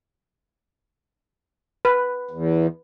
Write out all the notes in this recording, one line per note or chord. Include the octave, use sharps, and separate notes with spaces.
B4
E2